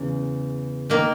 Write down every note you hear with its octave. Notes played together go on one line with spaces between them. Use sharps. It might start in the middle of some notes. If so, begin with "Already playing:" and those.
Already playing: E2 C#3
D#3 A#3 D#4